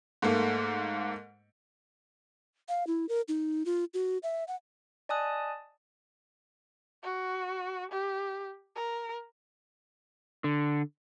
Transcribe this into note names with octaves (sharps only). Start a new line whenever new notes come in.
G#2 A3 A#3
F5
E4
A#4
D#4
F4
F#4
E5
F#5
D5 D#5 G#5 A5 D#6 F#6
F#4
G4
A#4
D3